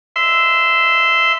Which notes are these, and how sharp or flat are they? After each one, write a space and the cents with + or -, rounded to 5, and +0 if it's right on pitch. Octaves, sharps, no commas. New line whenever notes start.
E5 +0 C6 -20